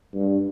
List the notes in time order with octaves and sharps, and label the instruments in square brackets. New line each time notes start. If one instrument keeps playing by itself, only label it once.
[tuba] G2